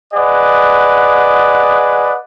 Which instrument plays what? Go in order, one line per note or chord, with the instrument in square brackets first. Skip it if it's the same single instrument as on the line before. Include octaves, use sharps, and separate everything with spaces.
[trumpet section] G#4 B4 D5 D#5 F#5